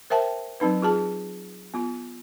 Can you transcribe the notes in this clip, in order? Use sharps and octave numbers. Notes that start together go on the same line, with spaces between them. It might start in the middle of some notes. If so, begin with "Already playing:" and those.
A#4 C5 E5 G5 A5
F#3 C4 D#4 B4
F4 G#4 A5
B3 F4